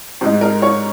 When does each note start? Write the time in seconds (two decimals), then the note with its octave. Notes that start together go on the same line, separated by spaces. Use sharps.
0.21 G#2 G#3 D#4
0.41 A#4
0.62 C#5